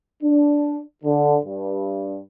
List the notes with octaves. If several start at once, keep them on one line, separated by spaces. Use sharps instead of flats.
D4
D3
G2